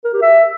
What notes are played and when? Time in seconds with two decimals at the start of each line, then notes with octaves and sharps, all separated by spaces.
0.04 A#4
0.13 G4
0.22 E5